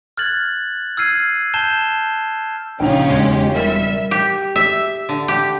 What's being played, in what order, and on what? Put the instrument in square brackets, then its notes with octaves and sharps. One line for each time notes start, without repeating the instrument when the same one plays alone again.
[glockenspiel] F6 F#6 G#6 A6 F#7
E6 F6 G#6 C7 D#7
A5 G6 E7 G7
[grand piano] A#1 F7 [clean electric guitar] C#3 D#4 G5 [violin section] C#4 F4 G4
[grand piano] E1 G#6 [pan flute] G#3
[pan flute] G3 [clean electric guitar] A#4 [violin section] E5
[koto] G4
E5
D3
G4